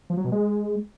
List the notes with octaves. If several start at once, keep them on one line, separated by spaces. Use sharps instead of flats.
F3
F#3
B2
G#3